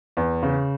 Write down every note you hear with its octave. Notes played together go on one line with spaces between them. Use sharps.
E2
C#3